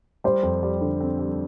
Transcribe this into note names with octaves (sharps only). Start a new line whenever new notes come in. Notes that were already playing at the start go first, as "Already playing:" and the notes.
G3 C5
F2
G3
D3
C4
G3